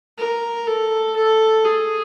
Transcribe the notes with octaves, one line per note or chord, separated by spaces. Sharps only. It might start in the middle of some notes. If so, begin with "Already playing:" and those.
A#4
A4
A4
G#4